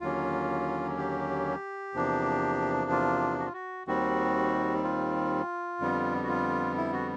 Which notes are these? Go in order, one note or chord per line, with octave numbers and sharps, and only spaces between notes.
D#2 D3 F#3 A#3 C#4 F4
G4
E2 C3 F3 A#3 D4
F4
F#4
F4
F#4
D#2 D#3 G3 C4 F#4
F4
F2 D3 G3 B3
F#4
F4
E4
F#4